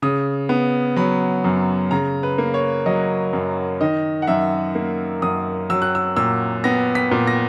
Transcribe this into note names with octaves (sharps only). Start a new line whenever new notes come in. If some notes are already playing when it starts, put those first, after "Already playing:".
C#3 D#6
B3
F#3 B5
F#2
C#3 A#5
B4
A#3
C#5
F#3 D#5
F#2
D#3 D#5
F#5
F#2 E5
A#3
F#2 D#6
F#3 E6
F#6
E6
A#2 E6
B3 A#6
B6
A#2
A#6